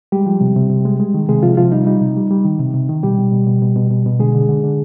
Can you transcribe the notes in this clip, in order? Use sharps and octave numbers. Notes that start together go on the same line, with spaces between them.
G3 G#3 G4
F3
C3
C3
C3
G#3
G#3
D#3
C3 G#3 G#4
C3 F3 F4
C3 F3 F4
G3 D#4
G3 D#4
C3
G3
G3
D#3
C3
C3
D#3
B2 G3 G4
B2
B2
B2
B2
B2
B2
B2
D3 G#3 G#4
D3
D3
D3